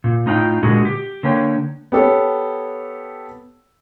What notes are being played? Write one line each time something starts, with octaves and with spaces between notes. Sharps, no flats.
A#2
A2 D#4 F4 F#5 G5
A#2 D3 G#3 F#4
G4
D3 A#3 C#5 G5
B3 G4 A4 C#5